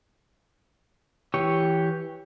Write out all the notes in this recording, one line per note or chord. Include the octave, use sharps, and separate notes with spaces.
E3 G4 C#5